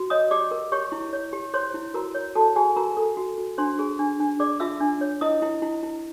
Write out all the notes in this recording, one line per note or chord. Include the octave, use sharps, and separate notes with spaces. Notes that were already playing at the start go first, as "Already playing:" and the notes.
Already playing: F#4
C#5 D#5 D#6
G4 D5 D6
A#4
G4 C#5 C#6
E4
C#5
G4
C5 C#5 C6
E4
F#4 A#4 A#5
C#5
F#4 A4 A5
F#4 G#4 G#5
F#4 A#4 A#5
A4
F#4
F#4
D4 C5 C6
G#4
D4
D4
G#4 D5 D6
F4 E5 E6
D4
C#5
E4 D#5 D#6
E4
E4
E4